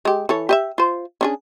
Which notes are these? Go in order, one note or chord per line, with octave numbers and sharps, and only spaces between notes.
G#3 G4
E3 A4 C#5
G4 D#5 E5
F4 C5
C#4 D4 G#4